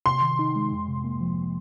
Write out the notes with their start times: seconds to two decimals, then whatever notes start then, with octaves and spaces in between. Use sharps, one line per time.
0.06 C3 C6
0.22 D#3
0.39 D#4
0.56 G#3
0.72 F2
0.88 C3
1.04 A#3
1.21 F3